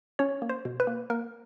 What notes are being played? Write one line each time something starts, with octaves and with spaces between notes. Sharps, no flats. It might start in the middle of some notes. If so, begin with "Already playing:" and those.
C#4 C#5
A#3
C5
B2
B4
A#3
A#3 A#4